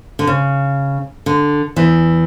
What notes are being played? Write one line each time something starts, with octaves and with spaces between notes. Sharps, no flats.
D3
C#3
D3
E2 E3